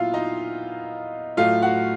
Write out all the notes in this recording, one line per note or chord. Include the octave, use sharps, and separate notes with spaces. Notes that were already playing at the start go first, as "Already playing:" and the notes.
Already playing: A#2 F#3 B3 E4 F4 F5
D#4 D#5
A2 F#3 A3 F4 F5
F#4 F#5